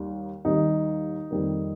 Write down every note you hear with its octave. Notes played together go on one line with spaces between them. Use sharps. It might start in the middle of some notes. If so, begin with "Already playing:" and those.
Already playing: D#2 D#3 G3
D#2 D#3 G3 D#4
F2 D#3 G3 A#3